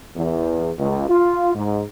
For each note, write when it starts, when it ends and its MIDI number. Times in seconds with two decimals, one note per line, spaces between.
0.17 0.70 40
0.79 1.07 37
1.09 1.53 65
1.55 1.83 44